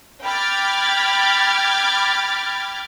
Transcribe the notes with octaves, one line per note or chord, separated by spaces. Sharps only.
G5 B5 D6 F6 G#6 A6